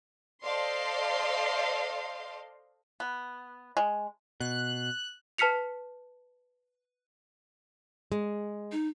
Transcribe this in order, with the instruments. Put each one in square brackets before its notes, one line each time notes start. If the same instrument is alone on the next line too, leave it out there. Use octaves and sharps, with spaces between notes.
[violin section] A4 C5 D5 D#5 F5 C6
[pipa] B3
G#3
[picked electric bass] B2 [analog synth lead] F#6
[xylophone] B4 A5 F6 B6 C#7 F7
[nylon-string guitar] G#3
[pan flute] D#4